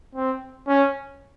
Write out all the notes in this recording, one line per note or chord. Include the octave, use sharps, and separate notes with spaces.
C4
C#4